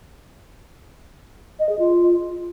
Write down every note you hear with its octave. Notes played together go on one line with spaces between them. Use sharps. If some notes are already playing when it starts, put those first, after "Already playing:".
D#5
G#4
F4